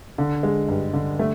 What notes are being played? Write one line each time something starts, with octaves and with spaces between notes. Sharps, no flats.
D3
G#3
G2
D3
A3